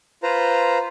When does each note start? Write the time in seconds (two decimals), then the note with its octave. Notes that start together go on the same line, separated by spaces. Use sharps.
0.23 F4 B4 C5 A#5